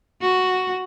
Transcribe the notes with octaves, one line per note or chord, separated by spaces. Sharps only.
F#4